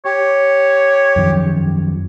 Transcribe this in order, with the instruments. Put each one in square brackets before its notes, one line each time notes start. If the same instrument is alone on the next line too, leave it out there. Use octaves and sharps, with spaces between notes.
[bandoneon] G4 [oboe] C#5
[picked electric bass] F#2 D#3 F3